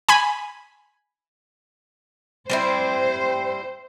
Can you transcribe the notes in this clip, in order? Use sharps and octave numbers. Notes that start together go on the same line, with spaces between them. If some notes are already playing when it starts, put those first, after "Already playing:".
G#5 B5
G3 C4 E4 C5